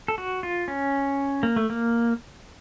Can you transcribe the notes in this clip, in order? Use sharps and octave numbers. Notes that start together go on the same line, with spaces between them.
A4
F#4
F4
C#4
A#3
A3
A#3